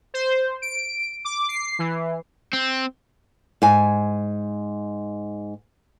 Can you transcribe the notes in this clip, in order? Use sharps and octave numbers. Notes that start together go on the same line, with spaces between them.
C5
D7
D6
C7
E3
C4
G#2 G#5